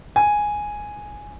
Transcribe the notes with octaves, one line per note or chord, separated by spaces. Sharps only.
G#5